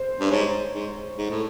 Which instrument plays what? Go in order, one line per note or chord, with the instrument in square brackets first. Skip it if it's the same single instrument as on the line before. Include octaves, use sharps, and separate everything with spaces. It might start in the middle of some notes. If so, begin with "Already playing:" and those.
Already playing: [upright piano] C5
[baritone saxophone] G2
[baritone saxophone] G#2 [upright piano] C#5
[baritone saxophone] G#2
G#2
A2